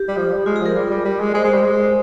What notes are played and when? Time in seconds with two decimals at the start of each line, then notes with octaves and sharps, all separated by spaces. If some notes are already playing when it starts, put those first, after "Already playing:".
Already playing: G4
0.09 G3
0.17 F3
0.32 G3
0.46 G#3 F4
0.56 G#4
0.61 F3 A#4
0.76 G3
0.91 G3
1.05 G3
1.20 G#3
1.34 G#3 C5
1.45 G#3
1.54 G3
1.64 G#3